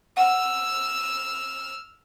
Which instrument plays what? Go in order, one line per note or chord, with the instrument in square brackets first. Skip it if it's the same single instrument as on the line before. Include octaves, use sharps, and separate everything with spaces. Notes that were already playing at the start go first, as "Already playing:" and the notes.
[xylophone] F#5 [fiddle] E6 F6